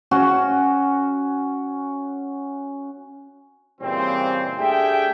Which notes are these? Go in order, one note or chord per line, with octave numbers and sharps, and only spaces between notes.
C#4 F#4
A#2 C#3 E3 G3 C4
A3 D4 G4 G#4 E5 G5